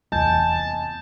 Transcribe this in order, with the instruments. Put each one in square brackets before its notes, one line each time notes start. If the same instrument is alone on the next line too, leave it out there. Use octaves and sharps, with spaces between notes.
[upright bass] F1 E2 [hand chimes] D#5 G#5 G6 [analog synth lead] A5